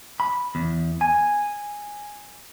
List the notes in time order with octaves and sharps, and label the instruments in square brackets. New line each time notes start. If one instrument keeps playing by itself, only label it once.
[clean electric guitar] B5
E2
G#5